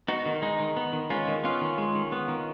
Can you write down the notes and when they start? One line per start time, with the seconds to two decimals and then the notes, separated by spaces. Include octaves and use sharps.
0.08 B3 D#4 F#4
0.26 D#3
0.42 G#3 D#4
0.60 D#3
0.77 B3
0.93 D#3
1.10 G#3 C#4 F4
1.28 D#3
1.44 B3 C#4 F4
1.61 D#3
1.78 G#3
1.95 D#3
2.12 B3
2.28 D#3